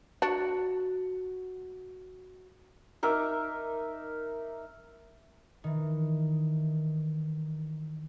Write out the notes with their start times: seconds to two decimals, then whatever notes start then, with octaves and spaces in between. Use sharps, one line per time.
0.22 D4 F#4
3.03 D#4 A#4 E5 D6
5.64 D#3 E3